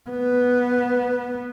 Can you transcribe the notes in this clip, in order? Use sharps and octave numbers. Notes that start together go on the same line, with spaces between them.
B3